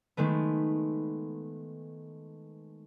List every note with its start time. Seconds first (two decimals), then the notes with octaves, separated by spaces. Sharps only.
0.17 D#3 G#3 A3 B3